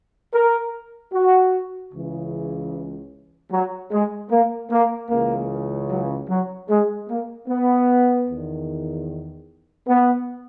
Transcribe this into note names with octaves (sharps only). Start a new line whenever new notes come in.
A#4
F#4
C#2 C#3 E3
F#3
G#3
A#3
A#3
C#2 C#3 E3 A#3
F#3
F#3
G#3
A#3
B3
E2 D#3
B3